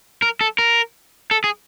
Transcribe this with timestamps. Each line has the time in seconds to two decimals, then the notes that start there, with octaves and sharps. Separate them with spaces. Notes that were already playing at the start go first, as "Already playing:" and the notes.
0.22 A#4
0.41 A4
0.58 A#4
1.31 A4
1.44 G#4